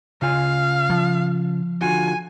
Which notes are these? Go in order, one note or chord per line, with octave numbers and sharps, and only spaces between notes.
C#3 F4 F5 G#5
F3
D3 F4 F#4 G#5